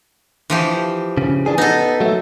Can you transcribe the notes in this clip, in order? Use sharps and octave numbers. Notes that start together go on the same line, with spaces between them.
E3 F3 G4
C#3
E3 D4 G#4
B3 D#4 A4
F#3 A3